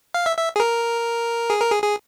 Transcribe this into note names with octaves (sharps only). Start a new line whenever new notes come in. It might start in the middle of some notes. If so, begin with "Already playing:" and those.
F5
E5
E5
G#4
A#4
G#4
A#4
G#4
G#4